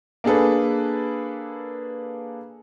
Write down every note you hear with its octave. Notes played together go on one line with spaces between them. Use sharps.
A#3 D4 G#4 A4 B4